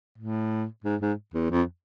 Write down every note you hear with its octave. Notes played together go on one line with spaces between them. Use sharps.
A2
G#2
G#2
E2
F2